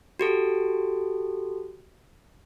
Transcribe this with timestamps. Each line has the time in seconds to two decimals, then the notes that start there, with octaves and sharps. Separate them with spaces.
0.19 F#4 G4 A4